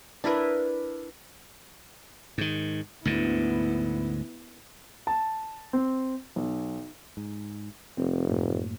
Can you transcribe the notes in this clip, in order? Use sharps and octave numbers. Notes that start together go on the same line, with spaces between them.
D4 E4 A#4 B4
G#2 D#3
D2 G#2 D3 B3 E4
A5
C4
B1
G#2
F1 C4
F#2 A2 A#3